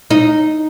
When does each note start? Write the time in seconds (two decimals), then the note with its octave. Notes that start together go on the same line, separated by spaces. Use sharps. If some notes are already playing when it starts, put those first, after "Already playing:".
0.10 D#4